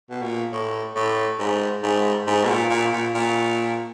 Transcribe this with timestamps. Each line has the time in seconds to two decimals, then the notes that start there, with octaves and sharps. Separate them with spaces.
0.10 B2
0.22 A#2
0.52 A2
0.96 A2
1.39 G#2
1.83 G#2
2.27 G#2
2.45 B2
2.49 A#2
2.70 A#2
2.92 A#2
3.15 A#2